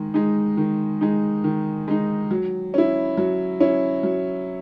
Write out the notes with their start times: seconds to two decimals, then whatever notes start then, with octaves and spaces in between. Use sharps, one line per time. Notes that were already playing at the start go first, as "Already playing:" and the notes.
Already playing: D#3 G#3
0.14 G#3 D#4
0.57 D#3
1.01 G#3 D#4
1.44 D#3
1.88 G#3 D#4
2.31 F#3
2.74 C#4 E4
3.18 F#3
3.60 C#4 E4
4.03 F#3